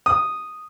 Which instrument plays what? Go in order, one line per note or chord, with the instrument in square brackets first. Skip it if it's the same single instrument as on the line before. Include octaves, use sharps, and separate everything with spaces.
[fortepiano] D#6